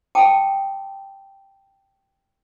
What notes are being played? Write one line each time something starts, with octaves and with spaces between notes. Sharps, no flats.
G5 A5 D6 D#6